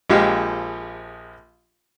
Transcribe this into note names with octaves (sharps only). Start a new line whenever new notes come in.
A#1 F3 G#3 G4 F5